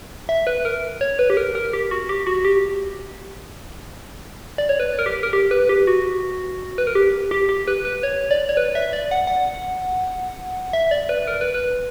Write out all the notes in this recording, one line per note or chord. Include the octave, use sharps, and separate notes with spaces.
E5
B4
A#4
C#5
B4
G4
A#4
A#4
G4
F#4
G4
F#4
G4
D5
C#5
B4
A#4
G4
A#4
G4
B4
G4
F#4
B4
A#4
G4
G4
G4
B4
B4
C#5
D5
C#5
B4
E5
D5
F#5
F#5
E5
D5
B4
A#4
B4
B4